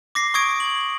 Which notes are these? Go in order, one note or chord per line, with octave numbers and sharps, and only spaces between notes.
D6 A#6 C7
C#6 D#6 G#6 D7
F#7